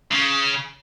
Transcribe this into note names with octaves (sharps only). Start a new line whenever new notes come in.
C#3